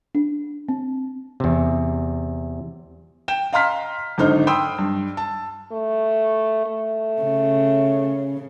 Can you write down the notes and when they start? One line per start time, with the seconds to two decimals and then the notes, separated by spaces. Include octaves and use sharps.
0.15 D4
0.69 C4
1.40 E2 C3
3.28 G5 E7
3.53 D#5 F5 A#5 C6 F6 B6
4.18 G#1 D3 D#4 C5 F6
4.47 G5 B5 C6 D#6 E6
4.79 G2
5.17 A5
5.72 A3
6.66 A3
7.22 C#3